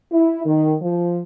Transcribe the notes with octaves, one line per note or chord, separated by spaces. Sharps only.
E4
D#3
F3